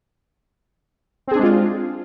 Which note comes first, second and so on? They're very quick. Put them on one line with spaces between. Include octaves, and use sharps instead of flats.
C4 G#4 D4 G#3 F4